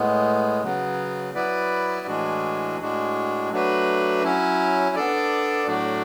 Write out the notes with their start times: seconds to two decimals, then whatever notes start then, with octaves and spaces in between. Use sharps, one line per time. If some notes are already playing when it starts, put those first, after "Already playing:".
Already playing: A2 G#3 B3
0.63 C#3 F#3 B3
1.34 F#3 B3 E4 B4 D5
2.07 A2 E3 G#3 D4 F#4
2.79 A2 G#3 D4 F#4
3.51 F#3 A3 D4 F#4 B4
4.23 F#3 C#4 E4
4.95 B3 D4 A4 D5
5.67 A2 F#3 A3 D4 F#4